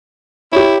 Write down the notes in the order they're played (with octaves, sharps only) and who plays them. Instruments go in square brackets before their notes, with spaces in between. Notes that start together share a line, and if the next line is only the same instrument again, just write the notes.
[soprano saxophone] E4 [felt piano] G4 C#5